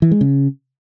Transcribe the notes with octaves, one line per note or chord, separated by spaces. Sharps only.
E3
G#3
C#3